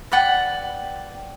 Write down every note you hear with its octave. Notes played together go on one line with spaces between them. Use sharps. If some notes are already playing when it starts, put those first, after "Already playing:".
B4 D5 F#5 G5